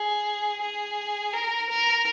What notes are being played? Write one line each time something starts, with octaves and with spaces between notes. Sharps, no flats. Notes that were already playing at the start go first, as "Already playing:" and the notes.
Already playing: G#4
G#4
A#4
A#4